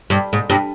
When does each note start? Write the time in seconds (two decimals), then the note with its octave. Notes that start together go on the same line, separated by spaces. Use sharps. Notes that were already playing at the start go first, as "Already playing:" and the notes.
0.10 G2
0.33 G#2
0.50 G2